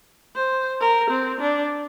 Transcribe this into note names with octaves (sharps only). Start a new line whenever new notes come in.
C5
A#4
C4
D4